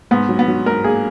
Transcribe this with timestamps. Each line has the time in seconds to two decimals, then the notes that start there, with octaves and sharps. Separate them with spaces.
0.11 G#2 B3
0.29 F#3
0.39 B3
0.48 F#3
0.66 G#2 A#4
0.84 A#3 G#4